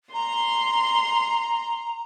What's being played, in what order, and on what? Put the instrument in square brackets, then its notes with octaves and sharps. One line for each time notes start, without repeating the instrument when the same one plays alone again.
[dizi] A#5 [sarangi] C6